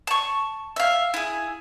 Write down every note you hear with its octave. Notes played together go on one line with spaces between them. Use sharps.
A5 C#6
E5 F5
E4 G#4